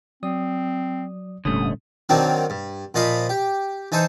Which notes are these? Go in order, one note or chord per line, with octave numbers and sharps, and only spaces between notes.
F#3 C4 D5 D#6
F1 A#2 D3 G3 A3 C#4 D#6
D#3 F#3 C4 D4 A#4
G2
A#2 F3 D#5 F5 B5
G4
E3 D#4 A4 C5